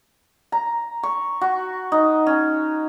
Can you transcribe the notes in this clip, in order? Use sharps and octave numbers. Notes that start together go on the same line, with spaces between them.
A#5
C#6
F#4
D#4
C#4